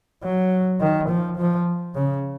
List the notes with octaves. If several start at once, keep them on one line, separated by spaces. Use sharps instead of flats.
F#3
D#3
F3
F3
C#3